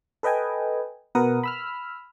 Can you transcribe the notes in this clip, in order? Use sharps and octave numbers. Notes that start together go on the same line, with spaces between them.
A4 B4 D#5 G5 G#5
B2 A#4 B4 F#5 D#6
B5 E6 F6